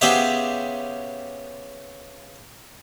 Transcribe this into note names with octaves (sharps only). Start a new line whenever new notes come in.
C#3 B3 G4 G#4 C5 E5